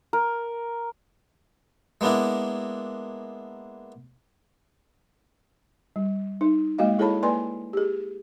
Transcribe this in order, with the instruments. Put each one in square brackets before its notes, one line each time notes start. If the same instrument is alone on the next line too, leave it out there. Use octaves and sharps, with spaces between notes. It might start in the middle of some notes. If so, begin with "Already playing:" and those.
[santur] A#4
[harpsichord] G#3 A#3 B3 D4 E4
[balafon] G3
D#4
G#3 A#3 F#4 D#5 F5
E4 G#4 A4 C#5 A5 B5
A#3 B4 D5 G#5 C6
G4 G#4